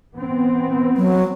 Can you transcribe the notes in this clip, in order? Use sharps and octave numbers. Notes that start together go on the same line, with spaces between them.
E3 B3 C4
F#3